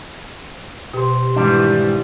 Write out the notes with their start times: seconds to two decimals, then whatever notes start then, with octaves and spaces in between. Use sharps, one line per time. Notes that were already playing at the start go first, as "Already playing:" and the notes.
0.94 B2 G4 C5
1.36 G#2 D#3 E3 G3 D4